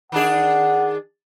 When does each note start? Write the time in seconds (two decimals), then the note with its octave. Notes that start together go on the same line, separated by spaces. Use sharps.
0.12 D#3 D4 G#4 F#5